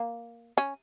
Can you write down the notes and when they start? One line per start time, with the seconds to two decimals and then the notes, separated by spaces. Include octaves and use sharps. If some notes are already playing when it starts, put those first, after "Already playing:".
Already playing: A#3
0.58 C#4